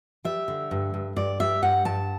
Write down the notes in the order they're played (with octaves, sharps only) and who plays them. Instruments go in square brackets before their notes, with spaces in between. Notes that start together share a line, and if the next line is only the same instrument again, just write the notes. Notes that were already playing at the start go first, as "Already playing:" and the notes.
[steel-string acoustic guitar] G3 E5
D3
G2
G2
G2 D5
G3 E5
G2 F#5
G2 A5